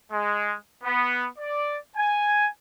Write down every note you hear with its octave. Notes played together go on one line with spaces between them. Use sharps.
G#3
B3
D5
G#5